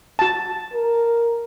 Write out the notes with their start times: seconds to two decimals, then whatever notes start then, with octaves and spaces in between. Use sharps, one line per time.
0.19 F#4 A5
0.74 A#4